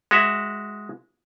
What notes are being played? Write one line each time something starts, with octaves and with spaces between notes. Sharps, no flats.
G#3 F#4 E5